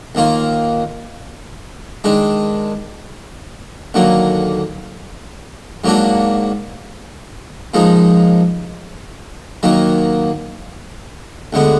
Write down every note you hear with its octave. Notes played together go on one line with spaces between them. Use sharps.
D#2 D#3 A#3 F4
D#3 G#3 D4
D#2 D3 F#3 A#3
G#2 F#3 A#3 D4 F#4
A#2 F3 G#3 D#4
D#2 D#3 F#3 A#3
D2 D3 G#3 B3